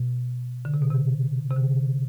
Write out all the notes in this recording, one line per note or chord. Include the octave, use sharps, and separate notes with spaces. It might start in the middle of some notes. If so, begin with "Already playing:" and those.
Already playing: B2
D3
C3
B2
C3
C3
D3